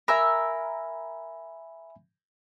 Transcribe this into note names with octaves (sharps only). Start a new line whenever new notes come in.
A#4 E5 G#5 B5 E6